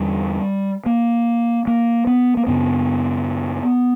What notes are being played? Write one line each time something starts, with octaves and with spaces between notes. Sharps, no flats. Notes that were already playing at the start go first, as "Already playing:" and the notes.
Already playing: E2 D3 G3
A#3
A#3
B3
A#3
F#2 C#3 B3